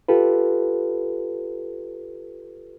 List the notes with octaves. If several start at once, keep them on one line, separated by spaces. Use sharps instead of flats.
F4 G4 A4 B4